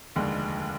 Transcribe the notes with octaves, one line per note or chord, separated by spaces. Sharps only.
F1 D#2 D3 G#3